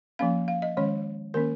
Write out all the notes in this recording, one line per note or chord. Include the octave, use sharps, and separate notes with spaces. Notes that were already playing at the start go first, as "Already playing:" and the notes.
F3 A#3 C#4 F5
F5
D#5
D#3 G#3 C#4 C#5
D#3 A#3 C#4 A#4